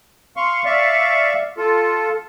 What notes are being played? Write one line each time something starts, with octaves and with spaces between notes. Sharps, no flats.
F5 C6 C#6
D5 E5 F5 C#6
F4 A4